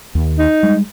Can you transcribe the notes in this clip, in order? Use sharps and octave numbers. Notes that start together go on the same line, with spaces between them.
D#2
D#4
G3 G#3